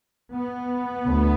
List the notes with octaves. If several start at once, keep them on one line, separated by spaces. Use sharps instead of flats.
B3
D2